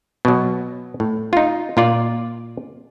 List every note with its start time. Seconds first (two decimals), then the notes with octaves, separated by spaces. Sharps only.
0.25 B2 F#3
1.00 A2
1.33 D#4 F4
1.77 A#2 F4 D5